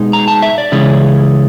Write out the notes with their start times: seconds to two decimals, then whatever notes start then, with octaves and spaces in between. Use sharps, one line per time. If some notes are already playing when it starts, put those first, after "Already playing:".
Already playing: B2 G#3 B3 D#4
0.13 A#5
0.28 A5
0.42 E5
0.58 D5
0.72 C#3 E3 G#3 C#4 E4